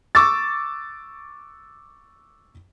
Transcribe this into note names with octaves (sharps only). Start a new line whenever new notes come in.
C#6 D6 E6 A6